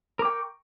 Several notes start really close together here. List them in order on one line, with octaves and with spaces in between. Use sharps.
A#4 D6 G5 C#6